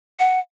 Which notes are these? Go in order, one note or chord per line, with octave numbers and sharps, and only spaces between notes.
F#5